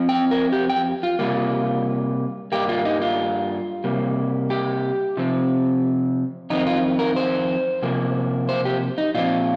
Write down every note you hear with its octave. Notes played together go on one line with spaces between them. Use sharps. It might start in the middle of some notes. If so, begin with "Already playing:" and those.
Already playing: F2 F3 C4
G5
A#4
G4
G5
F4
C3 G3 A#3 F4
G2 G3 A#3 G4
F4
D#4
F4
C3 G3 A#3
G4
C3 F3 C4
F2 D#3 C4 D#4
F4
A#4
C5
C3 F3 A#3
C5
G4
D#4
A#2 F3 C4 F4